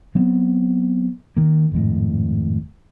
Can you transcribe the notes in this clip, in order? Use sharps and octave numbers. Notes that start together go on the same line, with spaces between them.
F#3 B3 C4
D#3 A#3
G#1 F2 A2